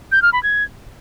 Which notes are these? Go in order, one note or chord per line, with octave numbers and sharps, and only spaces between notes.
G6
F6
B5
G#6